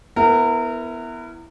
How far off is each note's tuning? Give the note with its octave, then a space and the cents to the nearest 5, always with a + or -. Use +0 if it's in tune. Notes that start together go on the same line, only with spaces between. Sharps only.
B3 +0 E4 +0 A#4 -30